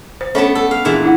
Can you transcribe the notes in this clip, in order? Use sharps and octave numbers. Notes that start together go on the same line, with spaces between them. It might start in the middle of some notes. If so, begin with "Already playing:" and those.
C5
A3 B3 C#4 D4 C#5 F#5
A4
F5
A#2 E3 D4 G#4
D4 E4 F#5